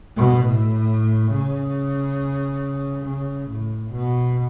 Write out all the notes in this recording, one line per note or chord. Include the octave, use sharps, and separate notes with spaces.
B2
A2
C#3
C#3
A2
B2